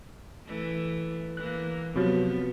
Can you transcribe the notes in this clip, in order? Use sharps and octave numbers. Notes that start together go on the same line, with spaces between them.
E3 A3
E3 A#3 F#6
C3 F3 F#3 B3